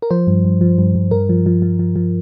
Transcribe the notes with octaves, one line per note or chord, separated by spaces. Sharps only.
A#4
F3 C5
G2
G2
F3
G2
G2
G2 A#4
F3
F3
F3
F3
F3